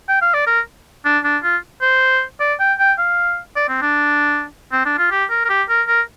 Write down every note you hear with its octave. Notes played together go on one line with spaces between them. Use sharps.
G5
F5
D5
A#4
D4
D4
F4
C5
D5
G5
G5
F5
D5
C4
D4
C4
D4
F4
G4
A#4
A#4
G4
A#4
A#4